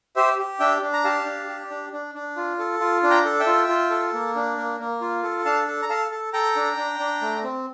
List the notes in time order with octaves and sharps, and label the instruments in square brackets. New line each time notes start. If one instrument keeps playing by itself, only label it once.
[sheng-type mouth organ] G4 C5 E5
G4
D4 E5 G5
D4
A#5
G4 F5 A5
D4
G4
D4
D4
D4
F4
A4
F4
D4
G5 A#5
A4
E5 G5
F4
F4
A4
A#3
D4
A#3
A#3
F4
A4
D4 F5 A5
A4
A#5
A4 F5 A5
A4
A4 G5 A#5
D4
D4
D4
A3
C4